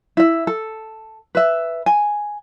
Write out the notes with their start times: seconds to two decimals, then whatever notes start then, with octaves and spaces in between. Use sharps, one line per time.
0.17 E4 E5
0.47 A4
1.35 B4 E5
1.86 G#5